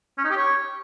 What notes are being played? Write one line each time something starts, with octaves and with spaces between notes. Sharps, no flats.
C#4
D#4
G4
C#5